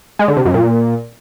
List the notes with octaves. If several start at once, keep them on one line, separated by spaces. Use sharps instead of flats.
G#3
D3
C3
F#2
A#2